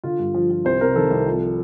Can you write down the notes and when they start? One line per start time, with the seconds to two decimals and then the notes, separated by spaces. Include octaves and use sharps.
0.04 D3 F4
0.19 G2
0.34 F3
0.51 F3
0.65 C2 C5
0.81 C3 A#4
0.96 D#3 A4
1.11 C2
1.26 F3